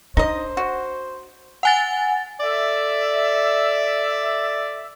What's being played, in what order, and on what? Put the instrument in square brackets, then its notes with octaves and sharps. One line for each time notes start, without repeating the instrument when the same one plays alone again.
[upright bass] D4 [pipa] D#4 D#5 [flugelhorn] C5
[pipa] F#4
[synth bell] F#5 G#5 A6
[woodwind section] A4 D5 E5